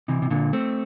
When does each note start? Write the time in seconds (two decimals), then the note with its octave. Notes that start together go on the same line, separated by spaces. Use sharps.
0.08 C3 E3
0.22 C3
0.30 A#2 D3
0.53 A3 C4